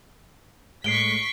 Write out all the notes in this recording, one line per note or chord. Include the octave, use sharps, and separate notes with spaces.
A2 G#3 C#6 B6 C7 D7 G7